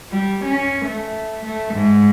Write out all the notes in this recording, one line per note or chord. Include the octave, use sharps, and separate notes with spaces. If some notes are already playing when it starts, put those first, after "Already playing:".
G3
C#4
A3
A3
G#2